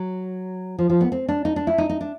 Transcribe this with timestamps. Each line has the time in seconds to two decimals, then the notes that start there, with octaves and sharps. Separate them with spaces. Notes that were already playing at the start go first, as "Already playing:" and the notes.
Already playing: F#3
0.79 F3
0.90 F3
1.01 B3
1.12 C4
1.29 D4
1.45 D#4
1.56 D4
1.67 E4
1.78 D#4
1.89 D#4
2.01 D4